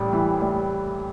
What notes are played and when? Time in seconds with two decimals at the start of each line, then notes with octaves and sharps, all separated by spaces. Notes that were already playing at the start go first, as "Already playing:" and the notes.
Already playing: A1 G3
0.13 E3
0.42 G3